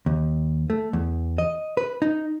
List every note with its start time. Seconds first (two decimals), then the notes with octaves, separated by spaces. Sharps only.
0.06 D#2
0.70 A3
0.93 E2
1.38 D#5
1.77 B4
2.02 D#4